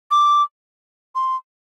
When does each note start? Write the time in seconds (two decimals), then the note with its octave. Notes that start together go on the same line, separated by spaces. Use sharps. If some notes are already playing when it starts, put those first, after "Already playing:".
0.11 D6
1.15 C6